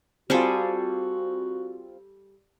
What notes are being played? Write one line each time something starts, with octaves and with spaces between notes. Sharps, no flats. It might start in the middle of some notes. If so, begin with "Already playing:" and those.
G3 C4 F4 F#4 G#4 A4